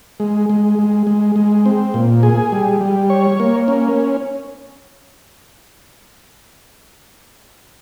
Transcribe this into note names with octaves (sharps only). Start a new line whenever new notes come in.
G#3
G#3
G#3
G#3
G#3
C4
A#2
G#4
G3
G3
C#5
A#3
C#4